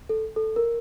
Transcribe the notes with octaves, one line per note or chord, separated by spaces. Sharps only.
A4
A4
A#4